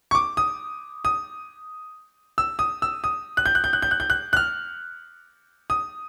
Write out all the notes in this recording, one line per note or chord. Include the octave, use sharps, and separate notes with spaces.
C#6
D6
D#6
D#6
E6
D#6
E6
D#6
F#6
G6
F#6
G6
F#6
G6
F#6
G6
F#6
F#6
F6
D#6